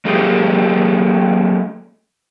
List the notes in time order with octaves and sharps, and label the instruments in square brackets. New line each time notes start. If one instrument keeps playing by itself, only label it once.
[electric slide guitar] F#3 A3 A#3 G4 G#4